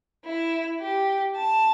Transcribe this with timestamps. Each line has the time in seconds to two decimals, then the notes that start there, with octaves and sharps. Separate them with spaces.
0.25 E4
0.81 G4
1.36 A5